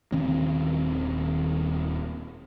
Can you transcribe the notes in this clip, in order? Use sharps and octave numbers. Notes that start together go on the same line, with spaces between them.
D#1 D#3 C4 C#4